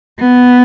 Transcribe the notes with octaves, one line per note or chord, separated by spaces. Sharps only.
B3